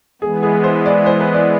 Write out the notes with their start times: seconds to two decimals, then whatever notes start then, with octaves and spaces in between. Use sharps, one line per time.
0.22 E3 G#3 B3 G#4
0.43 G#4
0.64 C5
0.86 D5
1.06 C5
1.20 B4
1.34 D5